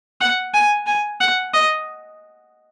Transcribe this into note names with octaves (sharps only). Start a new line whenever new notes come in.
F#5
G#5
G#5
F#5
D#5